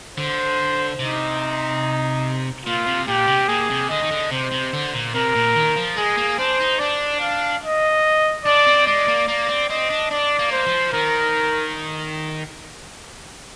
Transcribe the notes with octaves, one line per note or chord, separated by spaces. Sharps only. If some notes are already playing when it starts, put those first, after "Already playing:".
D3 C5
C3 D#4
A#2 F4
C3
A#2 G4
C3
A#2 G#4
C3
D3 D#5
D#3
D3
C3 C5
C3
D3
A#2
C3 A#4
A#2
D#3
F3
G#3 G#4
A#3
D4 C5
D#4
D4 D5
F5
D#5
D4 D5
C4
G#3 D5
A#3
A#3 D5
C4
C4 D#5
D4
D4 D5
A#3
C5
F3
D#3 A#4